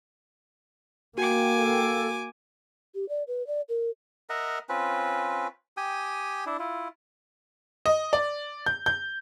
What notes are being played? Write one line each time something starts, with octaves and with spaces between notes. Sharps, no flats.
A#3 F#4 G5 G#5 D6
A4 F5 G5
G4
D5
B4
D5
A#4
A#4 D#5 E5 F#5
C4 C#4 F4 B4
G4 G5 G#5 D#6
D4 E4
E4 F4
D#5
D5
G6
G6